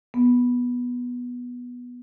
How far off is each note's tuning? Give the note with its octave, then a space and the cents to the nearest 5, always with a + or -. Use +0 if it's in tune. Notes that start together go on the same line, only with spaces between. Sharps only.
B3 -10